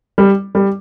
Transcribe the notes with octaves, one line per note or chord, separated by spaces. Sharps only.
G3
G3